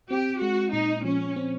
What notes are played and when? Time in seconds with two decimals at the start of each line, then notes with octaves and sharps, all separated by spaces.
0.10 C4 G4
0.42 G#3 F#4
0.73 A#2 D#4
1.05 F3 C#4
1.36 C4